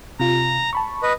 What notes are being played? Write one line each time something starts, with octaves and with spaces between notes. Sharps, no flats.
C3 F4 A#5
A5 B5 C#6
B4 D#5